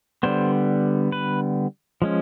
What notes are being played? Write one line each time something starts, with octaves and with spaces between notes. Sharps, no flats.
D3 G3 B3 C5
B4
F3 G#3 C#4